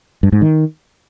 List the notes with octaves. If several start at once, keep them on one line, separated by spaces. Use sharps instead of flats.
G2
G#2
D#3